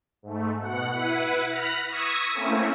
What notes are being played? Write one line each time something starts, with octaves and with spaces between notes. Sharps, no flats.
G#2 A3
B2 F#5
E4 B4 F#5
B5 F6 F#6 A#6 B6
C#6 D#6 E6 G#6 A#6 B6
A3 A#3 C4 C#4 E4